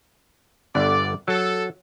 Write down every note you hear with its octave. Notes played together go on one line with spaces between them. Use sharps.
G1 D3 B3 D5
F#3 A4